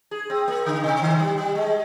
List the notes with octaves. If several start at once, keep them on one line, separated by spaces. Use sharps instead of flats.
G#4
C4
A#3
D3
C3
D#3
G3
G3
G#3